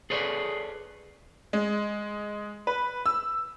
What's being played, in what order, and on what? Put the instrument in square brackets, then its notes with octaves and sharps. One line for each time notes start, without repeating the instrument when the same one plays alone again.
[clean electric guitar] G#4 A4 B4 C#5 D5
[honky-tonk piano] G#3
B4
E6